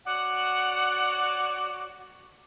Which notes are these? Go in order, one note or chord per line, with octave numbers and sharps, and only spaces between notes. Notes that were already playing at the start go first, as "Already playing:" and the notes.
F#4 C#5 D5 F#5